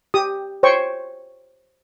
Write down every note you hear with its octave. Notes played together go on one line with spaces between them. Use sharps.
G4 D#6
C5 C#5 G5 C#6